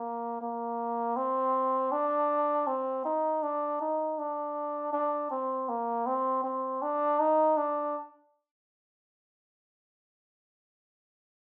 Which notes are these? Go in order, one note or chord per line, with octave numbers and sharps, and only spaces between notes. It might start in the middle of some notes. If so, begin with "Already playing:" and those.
Already playing: A#3
A#3
C4
D4
C4
D#4
D4
D#4
D4
D4
C4
A#3
C4
C4
D4
D#4
D4